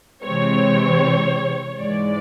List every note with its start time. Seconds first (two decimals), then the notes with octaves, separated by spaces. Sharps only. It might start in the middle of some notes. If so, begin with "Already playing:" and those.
0.23 C3 E3 G#3 C4 C#5
1.80 G#2 E3 G#3 D5